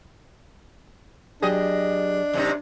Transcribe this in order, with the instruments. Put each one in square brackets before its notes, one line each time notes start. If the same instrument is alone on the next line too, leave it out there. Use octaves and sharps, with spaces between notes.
[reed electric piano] F#3 G4 G#4 [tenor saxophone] D4 [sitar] D#5
[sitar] F#2 C3 D#4